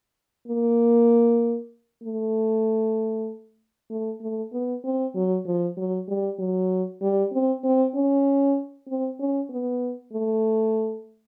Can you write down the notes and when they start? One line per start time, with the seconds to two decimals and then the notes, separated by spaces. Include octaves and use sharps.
0.48 A#3
2.03 A3
3.90 A3
4.21 A3
4.53 B3
4.84 C4
5.15 F#3
5.46 F3
5.77 F#3
6.08 G3
6.39 F#3
7.02 G3
7.32 C4
7.64 C4
7.95 C#4
8.88 C4
9.19 C#4
9.50 B3
10.13 A3